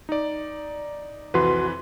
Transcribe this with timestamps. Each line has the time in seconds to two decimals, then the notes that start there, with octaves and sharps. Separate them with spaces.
0.09 D#4 D5
1.34 C2 F2 E3 F#4 B4 C6